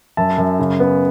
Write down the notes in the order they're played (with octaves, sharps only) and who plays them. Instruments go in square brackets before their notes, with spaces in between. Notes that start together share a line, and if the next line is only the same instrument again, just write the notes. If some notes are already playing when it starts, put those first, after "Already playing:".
[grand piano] F#2 E5 A5
F#2
C#3
B3